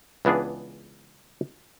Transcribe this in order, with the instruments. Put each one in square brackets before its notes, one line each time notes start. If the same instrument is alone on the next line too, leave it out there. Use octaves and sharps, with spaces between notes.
[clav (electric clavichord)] C#2 E3 B3 D4 G#4